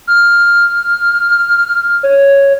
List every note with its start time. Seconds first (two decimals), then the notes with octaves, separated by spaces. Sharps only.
0.07 F6
2.03 C#5